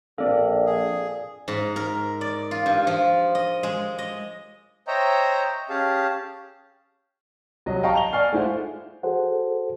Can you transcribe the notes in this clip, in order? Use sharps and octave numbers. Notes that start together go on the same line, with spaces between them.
A#1 C4 A4 D5 F5
G#4
G#2
A#4
D5
F4
G2
F3
D#5
G#3
D#5
C5 C#5 D#5 E5 G5 A#5
C#4 G4 G#4 F5 A5
C2 F#3 D#5
D#5 F5 G5 A5 A#5 C#6
F7 G7
D5 G#5 C#6 F6 C7
G#3 A3 E4 F4 C5 F#5
F#4 G#4 A4 C5 F#5